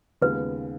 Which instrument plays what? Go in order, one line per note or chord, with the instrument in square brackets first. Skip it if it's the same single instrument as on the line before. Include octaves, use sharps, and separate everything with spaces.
[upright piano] D#2 C#3 G#3 B3 F4 [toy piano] B4